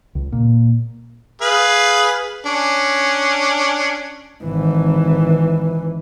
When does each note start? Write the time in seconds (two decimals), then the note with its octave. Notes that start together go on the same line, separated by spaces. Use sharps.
0.15 C#2
0.32 A#2
1.41 G#4 B4 F5
2.46 C#4 D4
4.43 G#1 E3